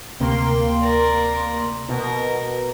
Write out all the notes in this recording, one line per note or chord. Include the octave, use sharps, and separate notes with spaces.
D2 C3 A#3 G5 C6
A#4 D5
B2 A#4